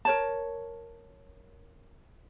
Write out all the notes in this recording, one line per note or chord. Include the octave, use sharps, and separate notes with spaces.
A#4 C#5 A5